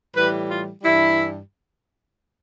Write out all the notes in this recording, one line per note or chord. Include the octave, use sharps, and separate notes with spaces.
A2 E3 G3 B4
F4
G2 E3 G3 E4